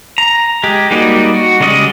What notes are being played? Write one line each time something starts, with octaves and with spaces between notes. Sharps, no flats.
A#5
G#3 G4
G3 A#3 D#4 F#4 D5
F#4
C#3 G3 G#3 D5 D#5